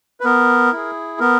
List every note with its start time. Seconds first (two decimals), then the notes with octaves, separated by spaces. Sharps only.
0.20 B4
0.25 B3 A#4
0.72 E4 G#4
1.20 B3 A#4